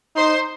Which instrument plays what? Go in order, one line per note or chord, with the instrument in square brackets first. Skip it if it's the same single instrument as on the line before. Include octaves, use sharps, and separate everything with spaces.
[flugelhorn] D#4 [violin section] C5 C6